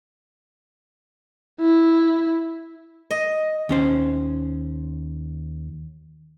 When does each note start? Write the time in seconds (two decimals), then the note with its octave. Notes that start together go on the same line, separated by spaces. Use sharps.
1.60 E4
3.11 D#5
3.69 D#2 C#4 C5